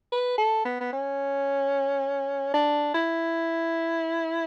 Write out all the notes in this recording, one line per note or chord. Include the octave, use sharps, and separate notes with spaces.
B4
A4
B3
B3
C#4
D4
E4